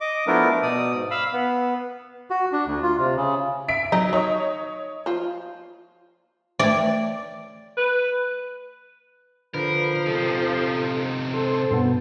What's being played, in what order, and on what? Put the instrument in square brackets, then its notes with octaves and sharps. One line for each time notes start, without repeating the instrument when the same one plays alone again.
[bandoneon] D#5 D6
F3 A3 B3 D4 E4 A#4
B2 D5 D#6
G#2
F5 B5 E6
B3
F#4
D4
D2
F4
C3
C#3
[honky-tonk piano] E5 B6 D7
[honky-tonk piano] F#3 [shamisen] D#4
[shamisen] D#3 [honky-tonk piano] C#5 D#5
[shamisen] F3 F4
[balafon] A3 E5 [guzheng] D5
[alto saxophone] B4
[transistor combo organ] D3 B4 [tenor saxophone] F3 [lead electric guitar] A#4
[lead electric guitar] C3 D#4 [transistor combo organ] A4
[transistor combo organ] A4 C5
[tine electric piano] G2 B2 B3